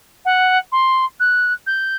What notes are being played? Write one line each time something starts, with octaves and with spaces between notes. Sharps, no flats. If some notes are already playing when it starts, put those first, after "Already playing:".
F#5
C6
F#6
G6